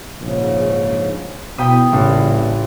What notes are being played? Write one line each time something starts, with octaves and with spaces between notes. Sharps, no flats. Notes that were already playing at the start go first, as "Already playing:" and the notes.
A#1 G#2 C#3
E2 B2 G5 B5 D#6
A1 G2 A#2 C#3